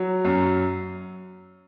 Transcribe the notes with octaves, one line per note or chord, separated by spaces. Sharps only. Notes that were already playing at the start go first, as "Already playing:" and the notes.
Already playing: F#3
F#2